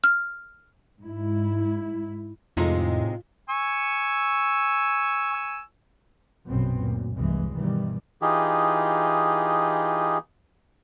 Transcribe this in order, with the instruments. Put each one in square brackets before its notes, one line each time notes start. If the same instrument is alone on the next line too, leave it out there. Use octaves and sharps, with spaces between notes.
[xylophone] F6
[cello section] G#2 E4
[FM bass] F2 [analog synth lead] A2 [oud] C3 G#3 D#4 [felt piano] F4
[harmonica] G#5 C#6 E6
[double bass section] A#1 F#2 B2 B3 C4
D2 A#2
F1 C2 G2 E3 G#3
G2 B2 D#3 E3 G3
[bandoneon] E3 D#4 F4 G4 G#4